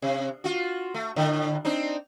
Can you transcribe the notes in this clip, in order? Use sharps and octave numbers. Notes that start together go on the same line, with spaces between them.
C3
F4 F#4
A3
A2 D3
C4 D4 D#4